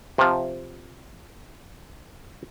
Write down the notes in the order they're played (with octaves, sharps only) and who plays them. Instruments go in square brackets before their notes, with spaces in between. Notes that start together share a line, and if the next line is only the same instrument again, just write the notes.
[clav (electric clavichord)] C3 F3